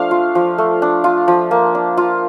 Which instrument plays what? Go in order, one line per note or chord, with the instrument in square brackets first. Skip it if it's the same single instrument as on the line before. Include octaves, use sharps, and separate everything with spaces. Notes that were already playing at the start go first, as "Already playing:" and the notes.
Already playing: [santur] F3 A3 D4 F5
F4
F3
A3
D4
F4
F3
A#3
D4
F4